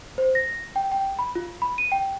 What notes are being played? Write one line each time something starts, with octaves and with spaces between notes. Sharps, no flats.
C5
A#6
G5
G5
B5
F4
B5
D#7
G5